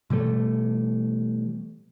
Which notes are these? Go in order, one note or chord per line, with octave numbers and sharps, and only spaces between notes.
B2 E3 G3 A3